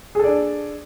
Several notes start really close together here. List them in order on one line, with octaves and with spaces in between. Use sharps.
G#4 A4 D5 D4